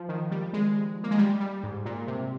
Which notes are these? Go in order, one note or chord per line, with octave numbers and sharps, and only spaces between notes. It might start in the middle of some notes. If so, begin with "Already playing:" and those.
Already playing: F3
D#3
G3
G#3
A#3
G#3
G3
G3
G#2
A#2
C3